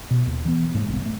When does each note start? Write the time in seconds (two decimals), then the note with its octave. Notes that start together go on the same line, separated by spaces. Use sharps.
0.11 B2
0.27 D#2
0.45 E3 B3
0.75 G#2 G#3 A#3
0.88 G1 C2
1.06 A3